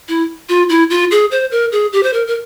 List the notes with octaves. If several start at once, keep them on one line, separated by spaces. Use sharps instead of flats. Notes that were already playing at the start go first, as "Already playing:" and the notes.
E4
F4
E4
F4
G#4
C5
A#4
G#4
G4
C5
A#4
A#4